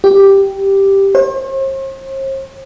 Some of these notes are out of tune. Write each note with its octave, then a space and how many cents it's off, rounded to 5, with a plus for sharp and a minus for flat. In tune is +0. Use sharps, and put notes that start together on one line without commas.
G4 +0
C5 +45